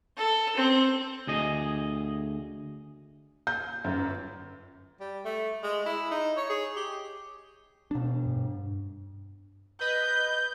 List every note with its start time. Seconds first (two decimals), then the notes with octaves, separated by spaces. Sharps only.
0.17 A4
0.56 C4
1.27 D2 G#4 D#5
3.47 G6
3.84 G1 F#2
5.00 G3
5.25 A3
5.63 G#3
5.86 E4
6.11 D#4
6.37 C#5
6.49 G#4
6.76 G4
7.91 B2 D4
8.26 G2
9.80 B4 D#5 G6